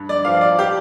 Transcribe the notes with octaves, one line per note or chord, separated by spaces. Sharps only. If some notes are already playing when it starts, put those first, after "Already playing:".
Already playing: G2
D5
F3 F5
D5
G4